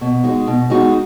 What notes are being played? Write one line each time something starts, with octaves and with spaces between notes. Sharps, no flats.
B2
G#3 D#4 F#4
B2
G#3 D#4 F#4